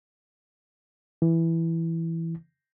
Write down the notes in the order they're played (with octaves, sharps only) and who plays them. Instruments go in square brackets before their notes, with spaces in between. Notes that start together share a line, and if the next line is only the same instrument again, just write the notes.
[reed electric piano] E3